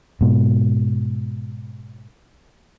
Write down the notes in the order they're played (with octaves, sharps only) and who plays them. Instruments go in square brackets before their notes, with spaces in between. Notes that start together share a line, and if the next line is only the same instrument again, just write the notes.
[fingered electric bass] G#2 B2